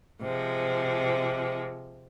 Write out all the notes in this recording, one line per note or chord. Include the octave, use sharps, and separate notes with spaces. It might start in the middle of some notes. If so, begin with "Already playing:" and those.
C3 F3 G#3